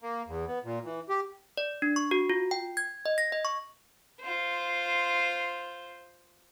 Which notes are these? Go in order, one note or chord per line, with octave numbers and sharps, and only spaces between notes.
A#3
E2
B3
A#2
E3
G4
D5
D4
C#6
F#4
F4
G5
G#6
D#5
A#6
D#5
C#6
F4 C5